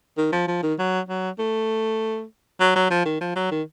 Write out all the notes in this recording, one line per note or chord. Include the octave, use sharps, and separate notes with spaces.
D#3
F3
F3
D#3
F#3
F#3
A3
F#3
F#3
F3
D#3
F3
F#3
D#3